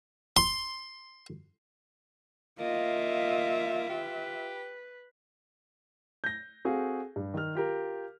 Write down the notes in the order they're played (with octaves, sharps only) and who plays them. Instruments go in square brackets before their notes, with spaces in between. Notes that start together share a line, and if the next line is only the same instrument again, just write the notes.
[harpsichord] C6
[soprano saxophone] A#3 [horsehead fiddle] F4 E5 [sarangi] D#5
[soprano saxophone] G4 [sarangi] B4
[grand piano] G6 A#6
C4 F#4 G#4 A4 F5
G2
D#3 F6
F4 G4 A#4